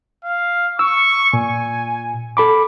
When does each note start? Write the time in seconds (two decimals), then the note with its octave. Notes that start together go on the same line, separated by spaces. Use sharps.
0.24 F5
0.79 C#6 E6
1.33 A#2 G#5
2.37 A4 B5 D6